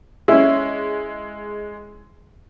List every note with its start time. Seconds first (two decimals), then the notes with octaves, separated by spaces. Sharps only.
0.28 G#3 C#4 E4